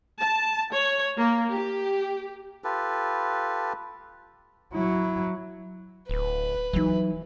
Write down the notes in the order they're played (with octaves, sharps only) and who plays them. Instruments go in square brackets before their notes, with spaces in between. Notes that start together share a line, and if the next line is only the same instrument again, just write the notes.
[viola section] A5
C#5
A#3
G4
[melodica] F4 G4 A4 B4
[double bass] F#3 E4
[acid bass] D1 [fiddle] B4
[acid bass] E3 [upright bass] F#3 D#4